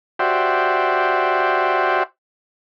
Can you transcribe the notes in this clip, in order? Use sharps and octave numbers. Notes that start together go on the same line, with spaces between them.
F#4 G4 C5 D5 E5